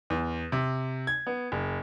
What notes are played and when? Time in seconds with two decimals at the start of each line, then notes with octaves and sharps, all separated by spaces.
0.10 E2
0.52 C3
1.07 G#6
1.27 B3
1.52 F#1